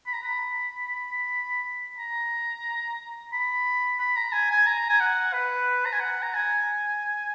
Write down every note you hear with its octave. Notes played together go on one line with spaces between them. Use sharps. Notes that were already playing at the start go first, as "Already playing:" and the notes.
B5
A#5
B5
A#5
B5
B5
A#5
G#5
G#5
A#5
G#5
F#5
B4
A#5
G#5
F#5
A#5
G#5